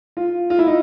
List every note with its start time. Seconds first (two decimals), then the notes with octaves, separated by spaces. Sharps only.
0.17 F4
0.50 F4
0.59 E4
0.67 D#4